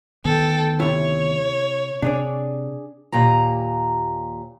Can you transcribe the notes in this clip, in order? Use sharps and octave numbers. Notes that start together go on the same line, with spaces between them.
D2 D#3 B3 A4 G5
C3 E4 C#5
C3 D4 G#4 D5
D#2 A#2 G4 A#5